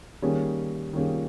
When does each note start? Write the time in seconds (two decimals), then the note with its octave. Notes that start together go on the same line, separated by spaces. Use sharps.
0.22 D#3 G3 A#3 C#4 G#4
0.93 D#3 G3 A#3 C#4 G#4